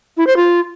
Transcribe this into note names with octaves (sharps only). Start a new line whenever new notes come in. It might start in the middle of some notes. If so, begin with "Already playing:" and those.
E4
C5
F4